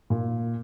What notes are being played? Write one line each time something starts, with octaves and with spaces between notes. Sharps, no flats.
A#2